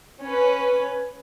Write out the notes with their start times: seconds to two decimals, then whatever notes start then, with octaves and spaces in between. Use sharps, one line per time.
0.21 C#4 B4